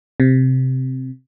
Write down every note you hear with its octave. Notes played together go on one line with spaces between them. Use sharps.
C3